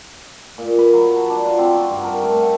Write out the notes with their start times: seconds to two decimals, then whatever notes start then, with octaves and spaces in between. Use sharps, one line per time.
0.58 A#2
0.79 B4
0.93 F#3
1.16 A5
1.30 D4
1.46 F4
1.58 C4
1.75 F#4
1.90 G2
2.03 A#4
2.23 A3
2.42 F#5